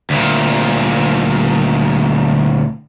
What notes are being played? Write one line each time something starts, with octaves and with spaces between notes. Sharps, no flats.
D2 A#2